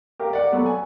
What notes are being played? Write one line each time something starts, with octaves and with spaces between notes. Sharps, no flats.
G4 A#4 F5
D5 F#5
F#3 B3 A4
G#5